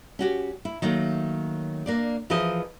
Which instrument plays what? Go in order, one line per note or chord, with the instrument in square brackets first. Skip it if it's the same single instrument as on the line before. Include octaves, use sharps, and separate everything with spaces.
[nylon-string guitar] C#4 F#4 G4
E4
D#3 F#3 A3 A#3
A#3 D4 D5
E3 F3 G#4 A#4 C5 D#5